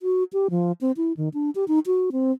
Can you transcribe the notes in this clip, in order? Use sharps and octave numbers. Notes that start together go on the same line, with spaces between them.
F#4
G4
F3
C4
E4
D#3
D4
G4
D#4
F#4
C4